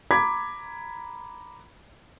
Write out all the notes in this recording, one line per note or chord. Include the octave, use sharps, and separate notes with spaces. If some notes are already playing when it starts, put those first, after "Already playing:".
A#5 B5 D6 G#6 B6